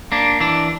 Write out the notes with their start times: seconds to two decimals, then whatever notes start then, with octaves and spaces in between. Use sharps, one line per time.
0.12 A#3 D4
0.41 E3 D4